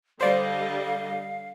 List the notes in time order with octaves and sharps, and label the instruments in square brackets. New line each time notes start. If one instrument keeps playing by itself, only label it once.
[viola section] D3 G3 D#5 [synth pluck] C5 D5 [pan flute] F5